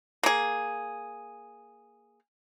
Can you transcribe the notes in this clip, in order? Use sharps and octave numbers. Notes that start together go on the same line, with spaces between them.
A#3 G#4